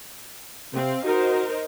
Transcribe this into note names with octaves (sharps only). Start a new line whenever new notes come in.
C3 C4 F5
D#4 F#4 A#4 C5